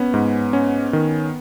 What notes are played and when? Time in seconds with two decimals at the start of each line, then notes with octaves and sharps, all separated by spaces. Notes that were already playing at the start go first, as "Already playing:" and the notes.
Already playing: B3 C#4
0.14 G#2
0.53 C#4
0.93 D#3